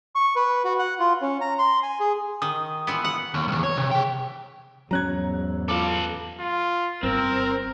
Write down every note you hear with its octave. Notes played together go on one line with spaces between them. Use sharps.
C#6
B4
F#4
F#5
F4
C#4
A#5
C6
G#5
G#4
D#3 D#6
A#2 E3 B3
F#5
D#2
B1 E2
C#5
C3
G#4 G5
E2 G#2 F#3 C#4 A#5 F#6 G#6
F4 A4 B4 D6
F4
G1 C4 A#4